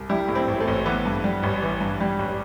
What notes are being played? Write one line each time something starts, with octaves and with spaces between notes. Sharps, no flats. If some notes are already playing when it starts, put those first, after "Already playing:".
Already playing: C2
G3 E4 G4
A2
C4 E4
A1
A3 C4
A1
E3 B3
G2
G3
A1
E3
G2
G3
A1